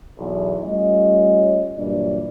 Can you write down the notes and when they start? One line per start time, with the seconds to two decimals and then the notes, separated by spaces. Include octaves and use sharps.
0.18 B1 E2
0.63 G3 A3 C#4 F4 C#5 D#5
1.77 G2 A#2 E3 F#3 D4 D5